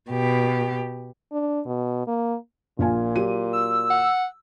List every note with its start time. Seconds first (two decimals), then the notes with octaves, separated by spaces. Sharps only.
0.10 B2 G4
1.32 D4
1.65 B2
2.07 A#3
2.79 A#1 A#2 F4 G#5
3.16 F#3 G4 D#7
3.53 E6
3.90 F#5